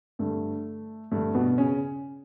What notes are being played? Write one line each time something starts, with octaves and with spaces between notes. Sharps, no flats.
G2 D3 A3
G2 D3 A3
B2 B3
C#3 C#4